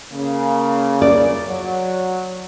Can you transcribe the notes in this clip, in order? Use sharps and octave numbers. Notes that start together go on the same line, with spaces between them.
C#3 A#3
D5
F#3